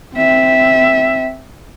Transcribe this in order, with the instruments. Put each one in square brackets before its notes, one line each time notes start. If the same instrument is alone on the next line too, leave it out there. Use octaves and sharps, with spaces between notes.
[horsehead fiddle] C4 E5